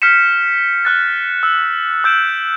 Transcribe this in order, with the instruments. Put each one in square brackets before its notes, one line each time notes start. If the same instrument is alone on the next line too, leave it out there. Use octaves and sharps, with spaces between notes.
[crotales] F6 G6 B6 C#7 E7
F6 F#6 A6
E6
E6 G6 D7 E7